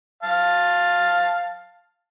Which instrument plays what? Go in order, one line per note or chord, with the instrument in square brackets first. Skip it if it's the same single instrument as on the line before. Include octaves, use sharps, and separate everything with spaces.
[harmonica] F5 A5